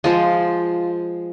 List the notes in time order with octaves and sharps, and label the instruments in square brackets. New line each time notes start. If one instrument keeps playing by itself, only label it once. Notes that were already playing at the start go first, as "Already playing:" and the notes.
[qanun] F3 G#3 [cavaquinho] F4 C5